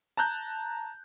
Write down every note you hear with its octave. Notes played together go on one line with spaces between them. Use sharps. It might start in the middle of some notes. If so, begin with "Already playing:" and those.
A5 A#5 F#6 G6